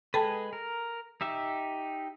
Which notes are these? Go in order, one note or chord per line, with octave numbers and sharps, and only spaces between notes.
G#3 G#4 A4 B4 G5 A5
A#4
D#4 G4 E5